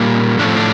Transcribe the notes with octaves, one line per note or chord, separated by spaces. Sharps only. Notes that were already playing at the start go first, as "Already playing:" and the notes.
Already playing: A#2 G3 A#3
A2 F3 A3 D4
C4
D4